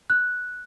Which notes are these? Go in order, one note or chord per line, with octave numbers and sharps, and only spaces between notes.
F#6